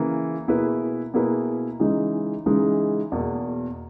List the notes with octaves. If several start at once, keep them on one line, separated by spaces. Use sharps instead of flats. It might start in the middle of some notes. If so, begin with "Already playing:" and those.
Already playing: C#3 E3 A#3
B2 A#3 E4 G#4 B4
B2 A#3 E4 G#4 B4
C#3 E3 G#3 D#4
C#3 E3 G#3 D#4
E2 B2 A#3